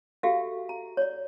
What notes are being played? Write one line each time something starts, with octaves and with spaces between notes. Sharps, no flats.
F#4 G4 A4 E5 F5
A#5
C#5 D5